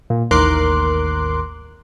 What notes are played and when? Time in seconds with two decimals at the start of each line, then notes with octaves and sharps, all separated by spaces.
0.10 A#2
0.31 A1 D#2 A#4 C6 D6 F#6